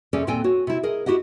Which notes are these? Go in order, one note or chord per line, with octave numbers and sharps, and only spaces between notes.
F2 C3 C#4 G#4 A4 D5
D#2 A#2 C4 A4 G5 G#5
F#4 C#5
C3 E4
G#4 A#4 D#5
E4 F#4 G4 D#5 F#5